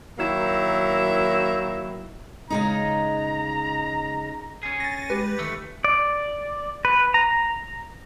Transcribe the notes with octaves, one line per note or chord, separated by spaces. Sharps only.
D#3 F#3 A#3 E4
C#3 G#3 D#4 A#5
C#4 G#4
A6 A#6
G#3 G4 B4
D#3 A3
D5
B4
A#5